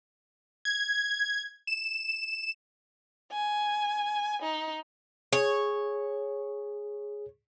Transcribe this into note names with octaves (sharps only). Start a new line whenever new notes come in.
G#6
E7
G#5
D#4
G#4 C#5